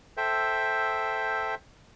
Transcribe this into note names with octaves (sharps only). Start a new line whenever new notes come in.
A4 C5 E5 G5